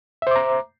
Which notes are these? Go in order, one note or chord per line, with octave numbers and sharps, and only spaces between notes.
C5 E5 A#5 D6